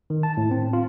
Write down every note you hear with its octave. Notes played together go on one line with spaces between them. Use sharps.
D#3
A5
A2
C4
F4